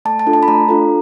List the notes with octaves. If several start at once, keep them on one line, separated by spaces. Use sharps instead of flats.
A3 A5
A5
D4 F4 A4
A5
B5
A3 A#5
D4 F4 A4